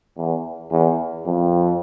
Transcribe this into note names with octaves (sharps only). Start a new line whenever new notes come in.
E2
E2
F2